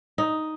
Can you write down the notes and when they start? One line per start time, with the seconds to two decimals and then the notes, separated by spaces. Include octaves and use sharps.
0.18 D#4